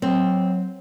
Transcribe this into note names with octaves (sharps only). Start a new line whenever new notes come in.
F#3 C4